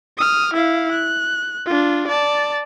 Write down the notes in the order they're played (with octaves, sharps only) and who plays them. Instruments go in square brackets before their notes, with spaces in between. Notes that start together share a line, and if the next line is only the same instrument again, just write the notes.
[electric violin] D#6 F6
E4 F5
F#6
D4 F4
D5 A5